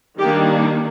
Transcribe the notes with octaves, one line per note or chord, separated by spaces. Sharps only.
D#3 G3 A#3 D4 G4